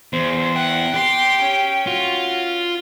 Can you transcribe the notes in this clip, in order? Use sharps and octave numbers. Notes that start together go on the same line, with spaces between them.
E2 C5
F#5 G5
G4 C6
C#4
F4 F#4